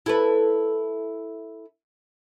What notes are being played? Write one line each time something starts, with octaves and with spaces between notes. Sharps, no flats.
E4 A4 B4